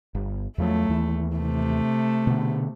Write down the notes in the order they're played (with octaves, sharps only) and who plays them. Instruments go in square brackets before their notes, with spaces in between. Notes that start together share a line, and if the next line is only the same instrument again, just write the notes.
[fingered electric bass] G1
[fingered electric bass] E2 F3 F#3 [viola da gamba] A3
[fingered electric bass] D#2 E3
[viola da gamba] C3 A3
[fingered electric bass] B2 D3